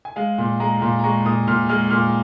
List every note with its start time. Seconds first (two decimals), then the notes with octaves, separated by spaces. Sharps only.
0.05 G#5
0.16 G#3 F5
0.38 A#2
0.60 G#3 A#5
0.82 A#2
0.99 A#5
1.04 G#3 C#6
1.26 A#2 D#6
1.47 A#2 F6
1.69 G#3 F6
1.90 A#2 F6